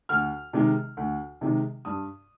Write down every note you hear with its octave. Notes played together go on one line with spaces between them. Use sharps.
D2 F6
C3 D#3 G#3
D2
C3 D#3 G#3
G2 D#6